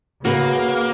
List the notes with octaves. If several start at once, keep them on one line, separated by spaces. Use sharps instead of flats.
C#3 A#3 F#4 B4